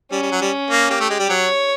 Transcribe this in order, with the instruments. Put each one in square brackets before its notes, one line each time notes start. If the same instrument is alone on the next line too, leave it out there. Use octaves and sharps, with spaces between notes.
[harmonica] G3 [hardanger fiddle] C#4
[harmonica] G3
F#3
G3
A#3
[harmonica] A#3 [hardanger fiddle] G4
[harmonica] A3
G#3
G3
[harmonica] F#3 [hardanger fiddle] C#5